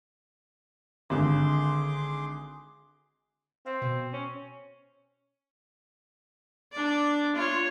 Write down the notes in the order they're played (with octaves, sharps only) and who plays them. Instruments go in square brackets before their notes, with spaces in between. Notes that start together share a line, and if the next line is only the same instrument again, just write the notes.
[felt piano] G#1 D3 [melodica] G#4 C6 D6
[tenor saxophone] C4 [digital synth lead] F5
[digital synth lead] B2
[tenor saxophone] C#4
[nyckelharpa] D4 D5
F4 C#5